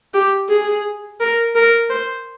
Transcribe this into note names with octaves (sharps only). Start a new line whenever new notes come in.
G4
G#4
A#4
A#4
C5